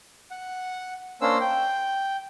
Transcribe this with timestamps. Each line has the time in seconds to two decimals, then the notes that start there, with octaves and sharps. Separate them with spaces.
0.31 F#5
1.21 A#3 C#4 D4 C5 E6
1.40 G5